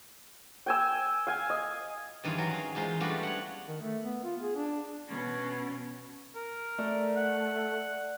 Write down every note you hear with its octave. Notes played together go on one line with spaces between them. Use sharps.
G5 G#5 E6
F5 G#5
D#5
G2 D#3 E3 C#4 F4 G#4
F#3
G#4 F5
E2 G#3 F4 C5
G3 A3 B3 D4 F4 F#4
C#5 F#5
D#3
A3
B3
F4
G#4
D4
B2 C#4
A#4
A3 D5
F#5